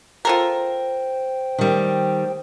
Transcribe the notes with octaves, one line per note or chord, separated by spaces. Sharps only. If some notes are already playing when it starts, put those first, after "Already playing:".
F4 A4 A#4 C5 G5
D#3 G3